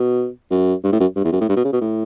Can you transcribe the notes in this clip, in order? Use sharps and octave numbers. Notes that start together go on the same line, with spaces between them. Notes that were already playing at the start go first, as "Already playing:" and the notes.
Already playing: B2
F#2
G2
A2
F#2
G2
E2
F#2
A2
G2
B2
C#3
B2
A2